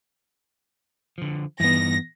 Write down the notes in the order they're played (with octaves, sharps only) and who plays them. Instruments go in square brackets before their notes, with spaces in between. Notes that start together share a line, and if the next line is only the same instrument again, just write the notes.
[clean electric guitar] D3 F3
[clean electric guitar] G2 D#4 [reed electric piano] E3 B3 [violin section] A#6